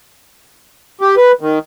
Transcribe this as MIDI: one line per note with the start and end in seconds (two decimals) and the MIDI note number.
1.01 1.15 67
1.17 1.32 71
1.41 1.59 51